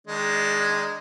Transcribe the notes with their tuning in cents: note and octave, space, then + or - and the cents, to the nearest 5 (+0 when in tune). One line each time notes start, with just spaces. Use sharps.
D#3 +25 G#3 +0 D4 +0